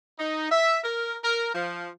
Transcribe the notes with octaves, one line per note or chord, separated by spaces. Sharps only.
D#4
E5
A#4
A#4
F3